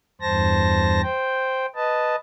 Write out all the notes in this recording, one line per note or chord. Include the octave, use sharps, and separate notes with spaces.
E2 G2 C5 A5 A#6
C5 G5
B4 D#5 A5